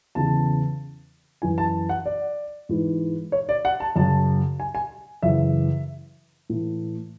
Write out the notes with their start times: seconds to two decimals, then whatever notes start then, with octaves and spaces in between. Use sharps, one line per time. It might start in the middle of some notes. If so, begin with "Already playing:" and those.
0.15 E2 C#3 E3 A5
1.42 F#2 E3 G#5
1.58 A5
1.89 F#5
2.06 D5
2.69 G#2 E3
3.32 C#5
3.49 D5
3.65 F#5
3.80 A5
3.96 F#2 C#3 F#3 A5
4.60 G#5
4.75 G#5
5.23 F#2 C#3 E3 E5
6.50 A2 E3